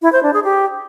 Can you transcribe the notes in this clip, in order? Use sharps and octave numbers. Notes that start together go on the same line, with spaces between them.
E4
C5
D4
G#4
G4